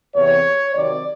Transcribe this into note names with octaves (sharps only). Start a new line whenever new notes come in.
E2 C3 E3 C#5
C3 D#3 F#3 D5